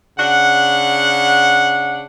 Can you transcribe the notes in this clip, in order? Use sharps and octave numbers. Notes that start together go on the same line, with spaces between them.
C#3 D4 F#5